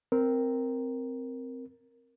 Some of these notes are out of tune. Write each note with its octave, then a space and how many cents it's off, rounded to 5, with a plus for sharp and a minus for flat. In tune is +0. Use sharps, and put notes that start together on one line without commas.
C4 -5 A#4 +0